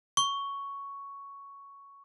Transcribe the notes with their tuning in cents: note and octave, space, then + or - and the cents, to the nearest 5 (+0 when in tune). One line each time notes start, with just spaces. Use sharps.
C#6 +5